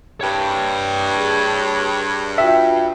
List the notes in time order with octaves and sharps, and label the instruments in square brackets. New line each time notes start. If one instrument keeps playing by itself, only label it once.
[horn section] G2 [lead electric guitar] C#5 G5
[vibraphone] G#4
[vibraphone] F4 F#4 G5 [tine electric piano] E5